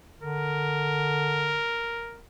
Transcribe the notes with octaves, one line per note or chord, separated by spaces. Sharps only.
D3 A#4